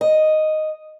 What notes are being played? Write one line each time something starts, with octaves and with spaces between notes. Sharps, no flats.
D#5